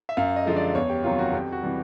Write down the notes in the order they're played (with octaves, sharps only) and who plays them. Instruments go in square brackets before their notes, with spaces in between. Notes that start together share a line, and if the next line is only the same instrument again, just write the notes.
[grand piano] E5
F#2 F5
D#5
D3 F3 G#3
D5
E2 C#5
G4
C3 D#3 F#3 F4
F#4
F2 G4
F#4
C3 E3 G3